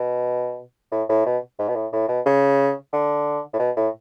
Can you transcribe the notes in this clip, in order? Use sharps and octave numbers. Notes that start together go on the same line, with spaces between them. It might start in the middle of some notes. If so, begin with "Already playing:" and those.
Already playing: B2
A2
A2
B2
G#2
B2
A2
A2
B2
C#3
D3
A2
B2
A2